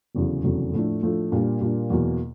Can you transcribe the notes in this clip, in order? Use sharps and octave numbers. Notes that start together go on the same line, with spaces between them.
F1 E2 C#3 F#3
F1 E2 C#3 F#3
A2 F3 A3 D4
A2 F3 A3 D4
A#2 G3 A#3 D4
A#2 G3 A#3 D4
E2 B2 F#3 A#3